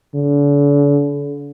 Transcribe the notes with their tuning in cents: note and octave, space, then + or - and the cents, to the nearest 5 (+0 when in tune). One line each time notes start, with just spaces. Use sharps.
D3 -40